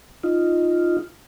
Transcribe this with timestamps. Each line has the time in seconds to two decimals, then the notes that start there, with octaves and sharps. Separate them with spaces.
0.23 D#4 F4